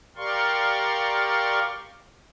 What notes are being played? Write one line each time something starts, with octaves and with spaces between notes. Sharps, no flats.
G4 A#4 D5 F5 C6 C#6